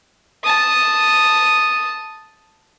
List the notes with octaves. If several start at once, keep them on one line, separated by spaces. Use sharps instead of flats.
A5 D#6